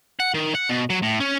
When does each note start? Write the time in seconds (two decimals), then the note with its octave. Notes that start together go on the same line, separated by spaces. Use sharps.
0.20 F#5
0.34 D#3
0.55 F#5
0.69 B2
0.90 F#3
1.02 A2
1.20 C#4